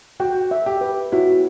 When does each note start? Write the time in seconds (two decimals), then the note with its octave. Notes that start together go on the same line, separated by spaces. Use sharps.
0.20 F#4 G5
0.51 E5
0.66 G4
0.81 B4
1.12 E4 F#4